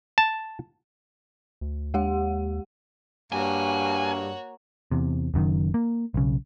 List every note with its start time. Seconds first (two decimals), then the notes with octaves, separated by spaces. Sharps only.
0.18 A5
1.61 D2
1.94 D#2 G#3 G4 F#5
3.32 G2 A#3 F#4 C#5 G#5
4.92 E2 C3
5.34 F#1 F#2 B2 D#3
5.74 A#3
6.14 B1 C#3